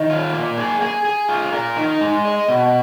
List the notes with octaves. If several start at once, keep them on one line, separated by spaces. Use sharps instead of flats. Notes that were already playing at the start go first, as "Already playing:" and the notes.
Already playing: D#3
F4
A#3
G#4
G#4
G#4
F4
A#4
D#4
G#3
D#5
B2